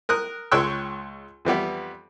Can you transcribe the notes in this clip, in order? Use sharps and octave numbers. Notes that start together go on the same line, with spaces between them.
A#4 D#6 F#6
C#2 G#3 C#5 G5 E6 F#6
F2 E3 G3 B3